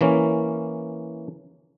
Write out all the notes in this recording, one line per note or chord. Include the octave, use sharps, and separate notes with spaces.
E3 A#3 C#4